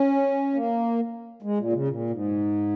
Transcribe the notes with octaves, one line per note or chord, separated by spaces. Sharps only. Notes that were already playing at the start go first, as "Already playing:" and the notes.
Already playing: C#4
A#3
G#3
A#2
C#3
A#2
G#2